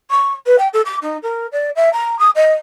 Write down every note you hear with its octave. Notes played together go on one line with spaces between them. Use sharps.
C#6
B4
G5
A4
D6
D#4
A#4
D5
E5
A#5
D#6
D#5